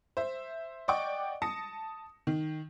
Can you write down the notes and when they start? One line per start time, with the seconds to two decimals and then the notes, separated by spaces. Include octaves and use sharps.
0.17 C5 E5
0.88 D5 D#5 F#5 G5 C#6 D6
1.42 A5 D#6 A#6 C#7
2.27 D#3